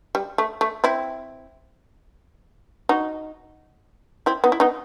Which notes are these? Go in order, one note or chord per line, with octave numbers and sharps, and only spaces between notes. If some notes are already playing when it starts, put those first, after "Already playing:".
G3
A3
A3
C4 E4
D#4 F#4
C4 E4
B3 D#4
E4
B3 D#4